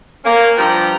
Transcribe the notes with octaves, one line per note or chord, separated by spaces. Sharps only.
A#3 C#4
G2 F3 G4 B4 G5 A#5